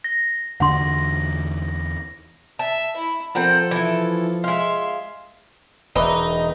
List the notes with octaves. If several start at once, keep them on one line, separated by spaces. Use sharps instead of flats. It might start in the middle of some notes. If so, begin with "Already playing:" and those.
A#6
E2 D3 D4 F#5 C6
E5 A5
E4
F3 C4 A4 A#4 F#5
E3 E4
G#3 E5 F5 C6
E1 D#4 B4 D5 E5